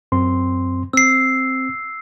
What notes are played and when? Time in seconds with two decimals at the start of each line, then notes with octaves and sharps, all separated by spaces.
0.12 F#2 C4 C6
0.93 C4 E6 C7